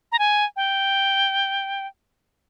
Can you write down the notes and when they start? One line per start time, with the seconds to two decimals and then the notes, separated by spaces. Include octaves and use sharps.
0.12 A#5
0.19 G#5
0.56 G5